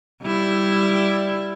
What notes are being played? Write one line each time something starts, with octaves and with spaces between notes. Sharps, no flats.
G3 E4